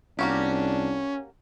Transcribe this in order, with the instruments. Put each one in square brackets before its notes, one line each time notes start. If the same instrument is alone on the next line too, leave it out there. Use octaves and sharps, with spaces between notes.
[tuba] C2 [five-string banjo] A#3 F#4 G4 [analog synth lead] C#4 [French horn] D4